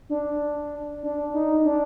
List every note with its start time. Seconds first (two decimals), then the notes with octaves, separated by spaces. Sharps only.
0.09 D4
1.03 D4
1.34 D#4
1.65 D4